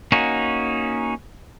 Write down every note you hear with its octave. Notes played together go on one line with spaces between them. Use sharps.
A#3 C#4 D#4 F#4